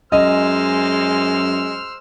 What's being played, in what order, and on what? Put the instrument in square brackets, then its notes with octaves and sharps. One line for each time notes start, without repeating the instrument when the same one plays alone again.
[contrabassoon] F#2 [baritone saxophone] G#3 [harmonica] C5 E6 F6 [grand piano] D#5